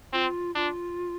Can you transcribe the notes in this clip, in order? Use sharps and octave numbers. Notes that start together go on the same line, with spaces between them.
C4 F4
D4 F4